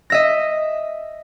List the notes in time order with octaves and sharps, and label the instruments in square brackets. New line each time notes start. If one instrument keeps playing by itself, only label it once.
[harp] D#5 E5 A#6